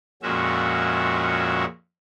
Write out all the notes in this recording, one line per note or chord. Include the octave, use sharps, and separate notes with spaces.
F2 A#2 G#3 C#4 F#4 E5